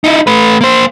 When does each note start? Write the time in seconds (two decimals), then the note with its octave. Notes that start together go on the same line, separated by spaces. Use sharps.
0.04 D#4 E4
0.27 A3 B4
0.61 A#3 C5